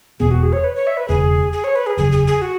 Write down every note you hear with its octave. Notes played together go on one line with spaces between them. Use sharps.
E1 E2 B2 B3 G#4
F#4
G#4
C#5
B4
C#5
E5
B4
E1 E2 C#3 G#4
G#4
C#5
B4
G#4
F#1 E2 C#3 F#3 G#4
G#4
G#4
F#4